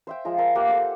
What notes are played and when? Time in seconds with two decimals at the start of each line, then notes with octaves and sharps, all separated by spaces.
0.07 C5 E5 G5
0.25 F3 G#3 A#5
0.38 A#4 C5 E5 A5
0.55 A#3 G4 F#5 G5
0.69 A4 C5 A5